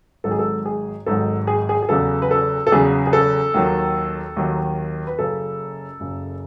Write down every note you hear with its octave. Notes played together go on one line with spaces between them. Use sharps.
G#1 G#2 F#3 A4
G#4
A4
G#4
G#1 G#2 F#3 A4
G#4
G#4
G#4
E2 C#3 F#3 A4
B4
A4
A4
E2 C#3 F#3 G#4
G#4
A4
D#2 D#3 F#3
D#2 D#3 F#3
B4
F#1 F#2 C#3 A4
F#1 F#2 C#3